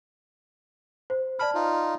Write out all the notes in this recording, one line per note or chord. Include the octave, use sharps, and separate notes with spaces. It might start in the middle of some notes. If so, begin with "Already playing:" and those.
C5
D5 A5 B5 F6
D#4 F4